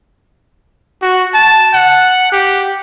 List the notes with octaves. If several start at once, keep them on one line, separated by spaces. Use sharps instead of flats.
F#4
A5
F#5
G4